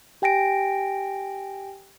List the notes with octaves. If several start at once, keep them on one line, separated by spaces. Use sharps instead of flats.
G4 G5 G#5 A#6 D7